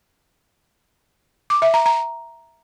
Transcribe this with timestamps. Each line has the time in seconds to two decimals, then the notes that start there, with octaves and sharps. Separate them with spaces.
1.50 D6
1.62 E5
1.74 A#5
1.86 A#5